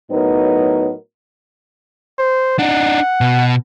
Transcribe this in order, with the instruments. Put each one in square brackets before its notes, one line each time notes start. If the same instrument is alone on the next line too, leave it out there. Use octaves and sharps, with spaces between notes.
[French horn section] A2 F#3 B3 D#4 A#4
[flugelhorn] C5
[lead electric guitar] D4 D#4 [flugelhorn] F#5
[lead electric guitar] B2